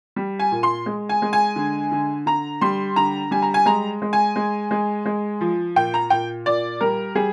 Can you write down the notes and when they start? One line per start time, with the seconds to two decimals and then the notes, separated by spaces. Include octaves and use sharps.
0.16 G3
0.39 G#5
0.52 A#2
0.63 C6
0.86 G#3
1.09 G#5
1.22 G#3
1.33 G#5
1.56 D3
1.91 D3
2.26 D3 A#5
2.61 G3 C6
2.96 D3 A#5
3.31 G3 G#5
3.42 A#5
3.54 G#5
3.66 G#3 A#5
4.02 G#3
4.13 G#5
4.36 G#3
4.71 G#3
5.06 G#3
5.41 F3
5.76 A#2 G5
5.94 A#5
6.10 A#2 G5
6.46 A#2 D5
6.81 G3 A#4
7.15 G3 G#4